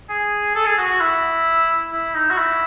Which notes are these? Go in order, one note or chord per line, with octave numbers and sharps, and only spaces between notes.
G#4
A4
G#4
F#4
F#4
E4
E4
D#4
F#4
E4